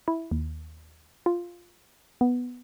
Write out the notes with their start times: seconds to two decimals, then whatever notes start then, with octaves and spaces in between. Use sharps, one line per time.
0.08 E4
0.31 D#2
1.26 F4
2.21 B3